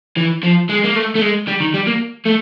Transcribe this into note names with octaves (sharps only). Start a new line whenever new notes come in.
E3
F3
G#3
A#3
A3
A3
G#3
G3
D#3
G3
A#3
A3